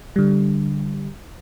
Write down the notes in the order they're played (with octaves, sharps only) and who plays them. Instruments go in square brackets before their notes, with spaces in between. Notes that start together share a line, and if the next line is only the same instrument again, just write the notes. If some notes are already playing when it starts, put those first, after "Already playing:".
[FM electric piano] D3 G3